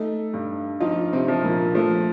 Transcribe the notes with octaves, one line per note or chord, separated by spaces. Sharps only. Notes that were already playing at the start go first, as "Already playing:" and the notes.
Already playing: A3 D#4 A4
G2
F3 D#4 F4
C3 C4
F3
A#2 A#3
F3 A3